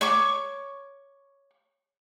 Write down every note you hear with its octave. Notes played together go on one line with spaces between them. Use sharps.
C#5 C#6 D6